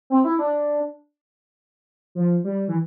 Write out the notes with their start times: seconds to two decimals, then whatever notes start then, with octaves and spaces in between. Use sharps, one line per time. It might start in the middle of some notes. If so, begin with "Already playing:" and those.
0.10 C4
0.24 E4
0.39 D4
2.15 F3
2.44 G3
2.68 E3